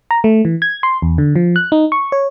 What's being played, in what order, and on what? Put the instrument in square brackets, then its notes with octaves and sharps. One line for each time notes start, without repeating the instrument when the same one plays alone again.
[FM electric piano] A#5
A3
E3
G#6
C6
E2
D3
F3
F#6
D#4
C#6
C#5